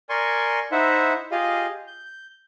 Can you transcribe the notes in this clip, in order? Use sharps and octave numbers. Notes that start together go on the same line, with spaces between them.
A#4 D5 G#5 C6 C#6
D#4 E4 C5 E5 F#5
F4 G4 G#4 D#5 F5
G6